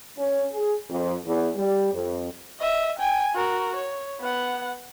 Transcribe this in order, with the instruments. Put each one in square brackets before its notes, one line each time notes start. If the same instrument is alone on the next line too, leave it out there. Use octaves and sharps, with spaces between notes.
[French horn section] C#4
G#4
F2
E2
G3
F2
[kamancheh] D#5 E5
G5 G#5
F#4 A#4
C#5
B3 F#5